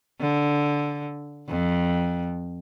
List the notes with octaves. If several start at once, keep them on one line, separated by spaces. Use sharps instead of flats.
D3
F2